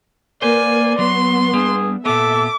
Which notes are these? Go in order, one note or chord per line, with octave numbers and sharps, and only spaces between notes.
A#3 B4 C5 D5 G#5
F#3 B3 C6
G3 D4 G#4
A#2 B3 A4 E5 D6